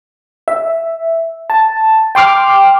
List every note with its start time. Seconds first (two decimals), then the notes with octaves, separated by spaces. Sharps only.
0.48 E5
1.50 A5
2.15 G5 C6 D6 F6